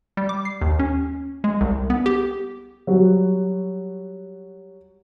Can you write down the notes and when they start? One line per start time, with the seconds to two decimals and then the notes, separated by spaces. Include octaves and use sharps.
0.17 G3
0.29 D6
0.45 C7
0.61 D#2
0.79 C#4
1.44 G#3
1.61 C2
1.90 B3
2.06 G4
2.87 F#3 G3 F#4